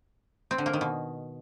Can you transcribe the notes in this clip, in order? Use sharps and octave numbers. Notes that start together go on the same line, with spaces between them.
C4
D3
A#3
D#3
B2